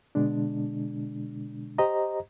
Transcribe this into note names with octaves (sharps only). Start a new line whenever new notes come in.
B2 D3 G#3 D4
G4 C5 D#5 A#5